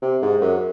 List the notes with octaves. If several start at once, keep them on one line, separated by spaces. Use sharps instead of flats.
C3
G#2
F#2